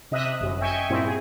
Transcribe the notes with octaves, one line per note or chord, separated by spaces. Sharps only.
C3 D#5 E5 D#6 F#6
G1 F#2
D#5 E5 G5 G#5 C#6
G2 A#2 C4 E4
G#4